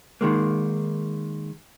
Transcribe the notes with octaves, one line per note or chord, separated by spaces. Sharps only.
D#3 G#3 A#3